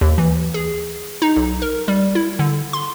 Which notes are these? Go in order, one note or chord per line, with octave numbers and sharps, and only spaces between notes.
D#2
E3
G#4
D#4
B1
A#4
G3
E4
D3
C6